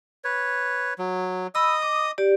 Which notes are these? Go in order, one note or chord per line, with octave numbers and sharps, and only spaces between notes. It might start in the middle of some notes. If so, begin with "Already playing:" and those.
B4 C#5
F#3
D#5 B5 D#6 E6
D6
G4 D5